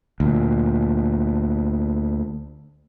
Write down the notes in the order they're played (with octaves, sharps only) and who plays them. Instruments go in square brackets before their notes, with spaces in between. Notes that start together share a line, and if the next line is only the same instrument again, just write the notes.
[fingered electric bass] D2 A#2